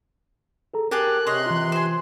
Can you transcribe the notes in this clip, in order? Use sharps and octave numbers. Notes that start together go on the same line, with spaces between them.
G#4 A4 A#5
G4 G#4 A#4 A5 F#6
C3 C#5 D#5 C6
E3 F4
C5 G#5